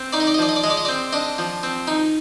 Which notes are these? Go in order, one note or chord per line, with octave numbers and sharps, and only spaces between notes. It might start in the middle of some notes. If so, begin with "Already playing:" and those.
Already playing: C4
D#4 D5
D#5
D5
D#5
F3 D5
D#5
D5
G#3 D#5
D5
D#5
C4 D5
D4 D#5
F3
C4
D#4